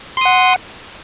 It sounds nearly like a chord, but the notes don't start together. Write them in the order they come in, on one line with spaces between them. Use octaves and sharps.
C6 D#6 F#5